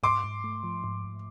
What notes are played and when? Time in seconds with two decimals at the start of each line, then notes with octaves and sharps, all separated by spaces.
0.03 G#2 C6 D6
0.24 G#2
0.44 A3
0.64 F3
0.84 G#2
1.04 G#2